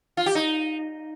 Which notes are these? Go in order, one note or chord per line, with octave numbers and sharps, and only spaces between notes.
F4
G4
D#4